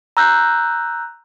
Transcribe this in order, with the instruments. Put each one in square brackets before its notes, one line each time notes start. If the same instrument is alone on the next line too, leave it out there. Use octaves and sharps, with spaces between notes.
[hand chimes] A#5 E6 F#6 G6